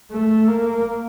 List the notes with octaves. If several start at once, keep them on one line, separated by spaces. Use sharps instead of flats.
A3
A#3